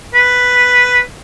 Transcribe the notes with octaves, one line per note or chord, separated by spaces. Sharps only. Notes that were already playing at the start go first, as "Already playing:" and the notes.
B4